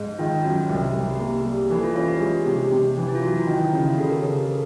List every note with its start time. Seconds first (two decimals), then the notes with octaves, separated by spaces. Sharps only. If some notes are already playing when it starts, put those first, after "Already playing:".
Already playing: G#2
0.19 D#3 F4
0.44 F#2 F#4
0.69 C2 G4
0.94 C2
1.10 G4
1.19 A#3 G#4
1.45 G3
1.70 E3 G4 A4
1.83 F4
1.96 C#4 F4
2.08 G4
2.20 G#3 G#4
2.46 C3 G4
2.72 C3
2.97 E3
3.08 E4
3.15 F4
3.22 F#3 F#4
3.39 E4
3.47 D#3
3.56 E4
3.73 C#3 F4
3.86 F#4
3.98 C#3 G4 A4
4.11 G#4 A#4
4.23 C#3 G#4 A#4
4.49 A4 B4